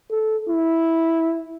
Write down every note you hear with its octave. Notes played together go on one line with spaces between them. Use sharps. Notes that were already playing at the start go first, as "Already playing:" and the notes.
A4
E4